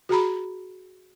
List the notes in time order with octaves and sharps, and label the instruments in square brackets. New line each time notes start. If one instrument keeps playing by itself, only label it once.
[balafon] F#4 G#4 A#5 B5